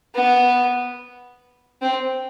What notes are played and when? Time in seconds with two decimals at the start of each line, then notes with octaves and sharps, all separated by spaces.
0.15 B3
1.81 C4